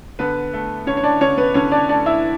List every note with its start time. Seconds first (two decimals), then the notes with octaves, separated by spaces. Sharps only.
0.19 D3 B3 B4
0.53 A3
0.87 D3 C#4 C#5
0.97 C#5
1.03 D4 D5
1.21 D3 C#4 C#5
1.37 B3 B4
1.54 D3 C#4 C#5
1.72 D4 D5
1.89 A3 D4 D5
2.06 E4 E5